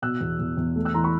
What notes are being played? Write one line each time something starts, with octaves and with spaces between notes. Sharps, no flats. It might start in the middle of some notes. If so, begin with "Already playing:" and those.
B2 E6 F#6
E2
E2
E2
A3
E6 F#6
E3 A#5 C6
B5 C#6